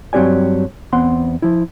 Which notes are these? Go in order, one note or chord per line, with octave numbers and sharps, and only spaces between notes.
G2 F#3 C4 G4 D5 G#5
E2 B3 C4 F#5 C6
F3 E4